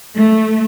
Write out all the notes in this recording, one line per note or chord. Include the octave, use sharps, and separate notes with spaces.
A3